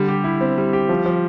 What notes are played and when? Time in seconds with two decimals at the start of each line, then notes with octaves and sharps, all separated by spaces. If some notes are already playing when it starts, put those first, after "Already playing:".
Already playing: D3 G3
0.08 G4
0.24 E4
0.41 C4
0.58 G3
0.73 G4
0.89 F3
1.06 F3